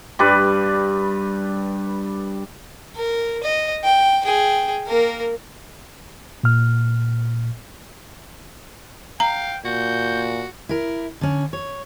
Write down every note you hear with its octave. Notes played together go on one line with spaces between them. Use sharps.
G2 G3 B4 D5
A#4
D#5
G5
G#4 G5
A#3 A#4
A#2 F6
F5 G5 A#5
A#2 F#4 G6
E4 A#4
D3 C#4
C#5